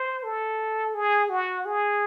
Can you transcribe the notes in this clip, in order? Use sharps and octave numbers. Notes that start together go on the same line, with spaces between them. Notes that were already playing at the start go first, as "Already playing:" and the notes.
Already playing: C5
A4
G#4
F#4
G#4